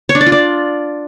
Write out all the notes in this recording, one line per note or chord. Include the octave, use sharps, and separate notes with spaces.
C#5
D4
D5
F4
D5